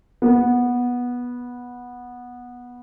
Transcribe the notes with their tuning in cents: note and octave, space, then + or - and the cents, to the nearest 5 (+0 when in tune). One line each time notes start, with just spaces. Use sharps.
B3 -10